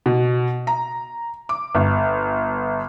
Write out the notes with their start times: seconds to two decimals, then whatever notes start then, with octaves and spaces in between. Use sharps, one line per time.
0.06 B2
0.67 A#5
1.49 D6
1.75 G1